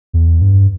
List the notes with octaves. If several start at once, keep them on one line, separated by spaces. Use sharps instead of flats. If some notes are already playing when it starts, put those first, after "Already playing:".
E2
G2